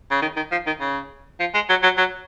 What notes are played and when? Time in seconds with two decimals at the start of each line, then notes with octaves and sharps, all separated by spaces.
0.11 C#3
0.22 D#3
0.36 D#3
0.51 F3
0.66 D#3
0.80 C#3
1.40 F3
1.54 G#3
1.69 F#3
1.83 F#3
1.98 F#3